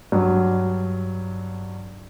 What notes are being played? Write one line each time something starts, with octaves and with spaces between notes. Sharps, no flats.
G2 F#3